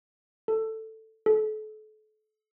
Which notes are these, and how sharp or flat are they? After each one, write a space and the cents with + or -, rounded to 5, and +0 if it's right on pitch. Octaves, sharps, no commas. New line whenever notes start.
A4 +10
A4 -35